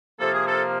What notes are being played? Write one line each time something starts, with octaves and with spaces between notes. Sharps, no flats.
C3 F3 A#3 A4
G#4
A4